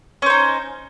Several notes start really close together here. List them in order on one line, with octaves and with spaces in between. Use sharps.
C#4 C5 D#4